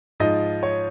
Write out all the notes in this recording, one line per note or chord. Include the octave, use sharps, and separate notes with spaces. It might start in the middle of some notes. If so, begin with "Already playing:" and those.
G#2 F3 D#5
C#5